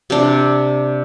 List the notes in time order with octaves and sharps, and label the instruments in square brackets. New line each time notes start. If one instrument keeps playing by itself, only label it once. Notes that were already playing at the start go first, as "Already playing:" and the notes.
[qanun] C3 D4